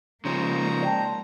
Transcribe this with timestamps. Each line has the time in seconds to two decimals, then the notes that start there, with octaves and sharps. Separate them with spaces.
0.25 C#3 F3 G#3 A#3 C5 A#5
0.82 D5 G5 A5